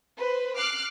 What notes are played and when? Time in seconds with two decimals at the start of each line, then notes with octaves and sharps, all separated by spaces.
0.17 B4 C5
0.57 D6 F6 F#6 C7